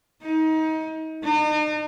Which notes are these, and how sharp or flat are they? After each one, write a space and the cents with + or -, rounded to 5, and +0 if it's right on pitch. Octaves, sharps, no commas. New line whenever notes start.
D#4 +30
D#4 -40